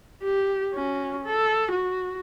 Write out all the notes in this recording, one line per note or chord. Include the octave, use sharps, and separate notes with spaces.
G4
C#4 F#4
A4
F#4